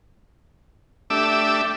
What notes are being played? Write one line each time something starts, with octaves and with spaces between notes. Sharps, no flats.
A3 D4 G4 E5 D6 E6